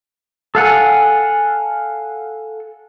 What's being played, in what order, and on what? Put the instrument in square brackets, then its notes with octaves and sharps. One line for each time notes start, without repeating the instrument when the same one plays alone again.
[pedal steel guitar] A4 F5 F#5 G#5